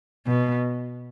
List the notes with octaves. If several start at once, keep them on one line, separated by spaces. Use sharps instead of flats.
B2